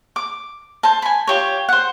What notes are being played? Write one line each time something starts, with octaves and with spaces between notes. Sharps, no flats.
D6
C5 A5
G#5 B5
F4 G4 C#5
C5 F#5